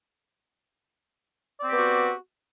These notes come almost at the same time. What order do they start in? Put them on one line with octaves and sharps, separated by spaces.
D5 C4 G4 B3 F#4